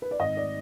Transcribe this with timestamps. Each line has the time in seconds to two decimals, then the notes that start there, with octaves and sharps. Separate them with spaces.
0.02 B4
0.11 D5
0.19 G#1 D#5
0.37 D5